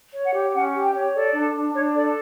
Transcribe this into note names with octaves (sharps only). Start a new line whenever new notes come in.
C#5
F#5
G4
C#4 F#5
G4
G5
C#5
A4 D5
D4
D4
D4 C#5
A4 D5